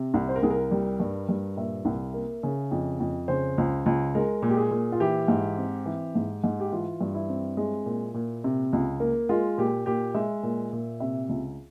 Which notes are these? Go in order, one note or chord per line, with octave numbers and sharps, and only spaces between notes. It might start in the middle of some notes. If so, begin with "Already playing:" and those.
Already playing: C3
C2
C5
A#4
C2 G#4
A#4
G3
G2
G2
A#2 E5
C2
A#3
C#3
F2
F2
C#3 C5
C#2
C#2
G#3 A#4
A#2
G4
G#4
A#2
F4
E3 G4
G#2
C4
E3
G#2
G#2
G4
E3 F4
G2
E4
C4
G#3
A#2
A#2
C3
C#2
A#3
G#3 F4
A#2 G4
A#2 G4
G#3 E5
A#2
A#2
C3 E5
C#2